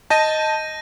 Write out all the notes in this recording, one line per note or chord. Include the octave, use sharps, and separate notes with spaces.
D#5 A5 G6 A#6 D#7